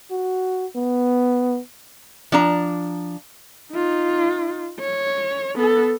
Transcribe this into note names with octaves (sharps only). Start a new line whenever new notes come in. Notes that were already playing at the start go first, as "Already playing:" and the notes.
F#4
B3
F3 D4 A#5
D#4 F4
C#5
B3 A4